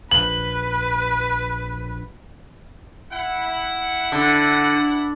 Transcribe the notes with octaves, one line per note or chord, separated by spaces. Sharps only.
A#1 B4 F#7
E4 F#5
D3